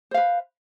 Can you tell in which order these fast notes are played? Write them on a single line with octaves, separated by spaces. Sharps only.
C5 F5 B4